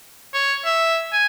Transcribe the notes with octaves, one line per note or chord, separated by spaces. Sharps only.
C#5
E5
G#5